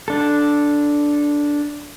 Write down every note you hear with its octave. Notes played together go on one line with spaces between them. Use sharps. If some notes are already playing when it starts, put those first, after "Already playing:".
D4 A4